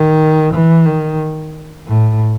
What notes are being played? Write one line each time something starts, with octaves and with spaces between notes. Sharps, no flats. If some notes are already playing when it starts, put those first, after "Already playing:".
Already playing: D#3
E3
D#3
A2